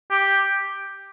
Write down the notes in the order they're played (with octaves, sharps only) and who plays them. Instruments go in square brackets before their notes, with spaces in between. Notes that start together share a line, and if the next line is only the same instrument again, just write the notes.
[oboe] G4